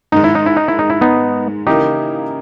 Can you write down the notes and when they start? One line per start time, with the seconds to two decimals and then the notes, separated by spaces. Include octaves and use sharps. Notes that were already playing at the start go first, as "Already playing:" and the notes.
0.12 G#2 D#3 G#3 D#4
0.24 E4
0.35 D#4
0.46 E4
0.57 D#4
0.68 E4
0.79 D#4
0.90 E4
1.01 B3 D#4
1.67 C#3 E3 A#3 D#4 E4 G4 A#4